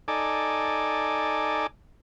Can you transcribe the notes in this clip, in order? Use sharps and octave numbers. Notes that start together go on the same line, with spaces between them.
D#4 A4 D5 G#5 D6